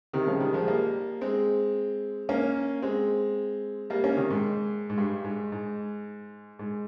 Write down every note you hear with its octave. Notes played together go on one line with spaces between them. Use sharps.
C3 D#3
C#3 F3
D#3 G3
F3 G#3
G3 A#3
G#3 C4
A#3 C#4
G#3 C4
G3 A#3
A#3 C#4
C3 D#3
G#2
G#2
G2
G#2
G#2
G#2